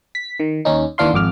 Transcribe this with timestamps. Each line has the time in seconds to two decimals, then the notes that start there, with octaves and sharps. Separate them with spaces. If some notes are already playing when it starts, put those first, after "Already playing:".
0.15 B6
0.40 D#3
0.65 D#2 C#4 D#4
0.98 D#2 E3 D4 F5 C6
1.13 G#1 F2 D6 F6